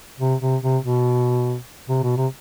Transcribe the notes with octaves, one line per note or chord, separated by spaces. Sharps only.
C3
C3
C3
B2
C3
B2
C3